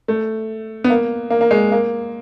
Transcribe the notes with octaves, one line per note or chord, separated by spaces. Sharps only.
A3
B3
A#3
A#3
A#3
G#3
A#3